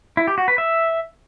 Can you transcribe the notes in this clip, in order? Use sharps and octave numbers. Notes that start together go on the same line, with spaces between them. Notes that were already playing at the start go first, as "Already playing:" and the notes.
E4
G4
F#4
B4
E5